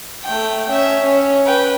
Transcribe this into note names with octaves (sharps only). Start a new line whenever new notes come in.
A3 G5
C#4 E5
C#4
B4 G5